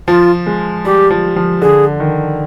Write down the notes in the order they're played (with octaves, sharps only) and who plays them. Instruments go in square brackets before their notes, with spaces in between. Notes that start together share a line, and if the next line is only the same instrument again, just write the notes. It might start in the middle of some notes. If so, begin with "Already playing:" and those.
[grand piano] F3 [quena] F4
[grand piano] G#3
[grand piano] G3 [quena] G4
[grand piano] F3
F3
[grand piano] D3 [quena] G#4
[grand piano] D#3